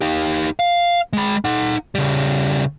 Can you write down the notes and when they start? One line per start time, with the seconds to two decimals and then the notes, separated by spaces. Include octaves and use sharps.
0.01 D#4 G4
0.59 F5
1.13 G#3 B5
1.44 D#4 F#5
1.95 C#3 G3